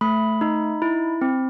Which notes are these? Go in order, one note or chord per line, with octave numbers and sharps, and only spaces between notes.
A3 B5
D#4
E4
C4